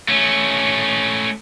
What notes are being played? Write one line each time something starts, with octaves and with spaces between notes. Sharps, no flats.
A3 C#4